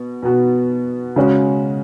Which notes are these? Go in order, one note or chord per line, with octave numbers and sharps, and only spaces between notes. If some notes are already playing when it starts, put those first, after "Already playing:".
Already playing: B2
B2 B3 F#4
C#3 G#3 C#4 F#4